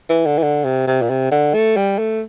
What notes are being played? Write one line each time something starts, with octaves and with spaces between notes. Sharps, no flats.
E3
D3
E3
D3
C3
C3
A#2
C3
D3
A3
G3
A3